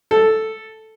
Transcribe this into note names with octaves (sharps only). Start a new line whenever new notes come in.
A4